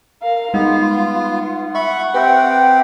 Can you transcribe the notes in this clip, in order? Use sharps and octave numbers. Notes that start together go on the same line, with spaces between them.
A#4 F5
G3 G#3 B3 D#4 F4
E5 F#5 B5 C#6
C4 G4 B4 E5